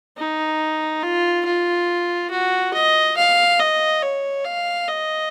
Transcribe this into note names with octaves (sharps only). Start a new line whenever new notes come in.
D#4
F4
F4
F#4
D#5
F5
D#5
C#5
F5
D#5